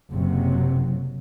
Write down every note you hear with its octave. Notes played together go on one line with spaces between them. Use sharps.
F#1 F#2 C3 F#3